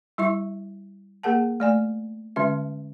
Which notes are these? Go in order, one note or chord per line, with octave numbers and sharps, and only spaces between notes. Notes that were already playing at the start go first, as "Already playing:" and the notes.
G3 E4 E5 C#6
A#3 G#4 A#4 F#5 A5
A3 D5 G#5
D3 G#3 C#4 E5